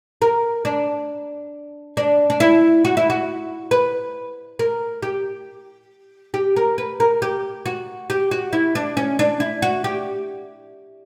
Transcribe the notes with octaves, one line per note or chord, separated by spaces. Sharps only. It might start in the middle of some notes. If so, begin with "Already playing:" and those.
A#4
D4
D4
D4
E4
F#4
E4
F#4
B4
A#4
G4
G4
A#4
B4
A#4
G4
F#4
G4
F#4
E4
D4
C#4
D4
E4
F#4
G4